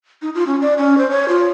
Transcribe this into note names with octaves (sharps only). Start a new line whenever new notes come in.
D#4
F4
C#4
D5
C#4
C5
C#5
F4